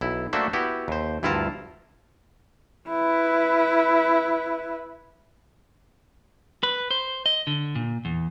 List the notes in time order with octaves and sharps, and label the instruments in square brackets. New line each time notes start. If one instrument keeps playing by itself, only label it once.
[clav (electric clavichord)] B1 E4
A3 A#3 D4 F#4 C5 E5
B3 E4 F#4 G4
D#2 C5
D2 G2 E4 F4 A5 A#5
[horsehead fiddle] E4 B4
[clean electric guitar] B4
C5
D#5
D3
A#2
E2